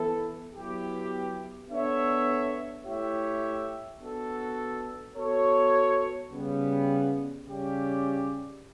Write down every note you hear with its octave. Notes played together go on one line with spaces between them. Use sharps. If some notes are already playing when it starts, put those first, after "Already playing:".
Already playing: E3 B3 E4 A4
F#3 B3 E4 G4
B3 D4 A4 C#5 E5
A3 E4 G4 C#5 E5
B3 D4 F#4 A4
B3 F#4 A4 C#5
C#3 G3 B3
C#3 G3 C#4 G4 D5